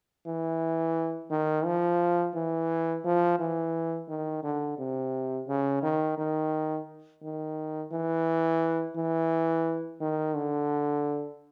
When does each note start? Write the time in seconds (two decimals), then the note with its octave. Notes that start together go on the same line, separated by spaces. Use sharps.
0.26 E3
1.31 D#3
1.65 F3
2.35 E3
3.04 F3
3.39 E3
4.09 D#3
4.43 D3
4.78 C3
5.48 C#3
5.83 D#3
6.18 D#3
7.22 D#3
7.92 E3
8.96 E3
10.01 D#3
10.36 D3